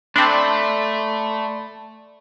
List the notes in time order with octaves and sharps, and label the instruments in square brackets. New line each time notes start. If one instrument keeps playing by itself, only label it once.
[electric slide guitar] A3 [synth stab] C4 D4 [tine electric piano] D5 B5 C6